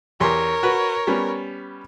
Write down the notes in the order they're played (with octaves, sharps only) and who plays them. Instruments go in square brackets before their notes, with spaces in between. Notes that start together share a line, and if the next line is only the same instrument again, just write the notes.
[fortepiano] E2 G4 C6 [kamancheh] A#4 C#5
[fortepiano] F#4 B4
G3 B3 C#4